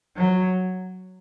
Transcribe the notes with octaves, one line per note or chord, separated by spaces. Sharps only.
F#3